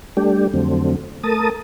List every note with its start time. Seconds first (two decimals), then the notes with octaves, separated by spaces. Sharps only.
0.17 G3 A3 D4 G4
0.54 F2 D3 F#3 A3 C4
1.23 A3 A#4 A5 D#6